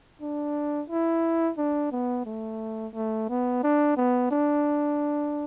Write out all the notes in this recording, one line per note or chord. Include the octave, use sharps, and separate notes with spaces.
D4
E4
D4
B3
A3
A3
B3
D4
B3
D4